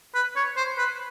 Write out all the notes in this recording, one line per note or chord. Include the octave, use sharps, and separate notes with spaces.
B4
C#5
C5
B4